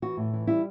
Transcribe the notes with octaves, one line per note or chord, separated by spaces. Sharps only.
E3 F#4
A2
E3
G3 E4